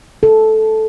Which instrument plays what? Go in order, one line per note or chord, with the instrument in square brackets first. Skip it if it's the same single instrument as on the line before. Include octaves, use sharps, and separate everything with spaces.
[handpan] A4